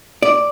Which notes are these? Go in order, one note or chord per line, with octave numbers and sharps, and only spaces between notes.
D5